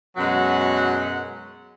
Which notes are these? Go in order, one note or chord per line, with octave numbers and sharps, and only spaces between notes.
F#2 B2 F#3 G#3 F#5